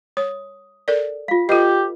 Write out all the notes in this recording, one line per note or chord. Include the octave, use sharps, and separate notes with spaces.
C#5 D#6
A4 A#4 D5
F4 F5
F4 G4 A4 B4 D#5